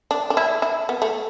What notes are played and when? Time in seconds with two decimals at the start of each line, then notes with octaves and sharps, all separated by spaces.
0.11 D4
0.30 D4
0.37 E4
0.62 E4
0.89 B3
1.02 A3